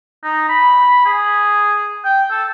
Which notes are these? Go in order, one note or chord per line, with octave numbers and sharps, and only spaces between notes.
D#4
B5
G#4
G5
A4